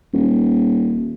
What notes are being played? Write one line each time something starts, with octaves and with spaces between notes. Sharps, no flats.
D#1